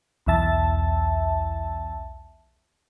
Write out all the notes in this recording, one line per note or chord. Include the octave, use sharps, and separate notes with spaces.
B1 E2 E5 A5